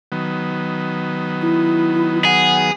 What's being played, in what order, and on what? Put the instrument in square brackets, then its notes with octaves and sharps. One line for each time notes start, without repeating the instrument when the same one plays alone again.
[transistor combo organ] D#3 F#3 B3
[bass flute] E4
[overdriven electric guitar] G#4 [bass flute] F#5